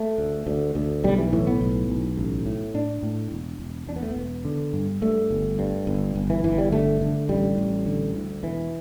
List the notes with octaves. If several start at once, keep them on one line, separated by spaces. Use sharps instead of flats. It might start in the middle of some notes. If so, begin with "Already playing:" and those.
Already playing: A3
D2
D2
D2
B1 G3
E3
A2 E3
B3
B1
B1
A1
A2
A2 D4
A2
E1
E1
E2 D4
B3
A3
B3
E1
D3
G2
G2 A3
G1
G2
G1
G1
E3
G1 E3
G3
D3 A3
D3
A1 G3
A1
D3
D2
E1 E3